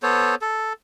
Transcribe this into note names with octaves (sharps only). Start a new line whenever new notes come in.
B3 A4 C5 C#5
A4